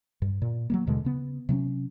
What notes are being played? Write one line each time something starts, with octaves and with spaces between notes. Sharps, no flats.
G2
A#2
F#3 G3 A#3
D#2 B2 D3 G#3
C#3 B3
C3 F#3 A#3 C#4